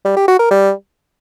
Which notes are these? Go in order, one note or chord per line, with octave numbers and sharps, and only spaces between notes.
G3
G4
F#4
A#4
G3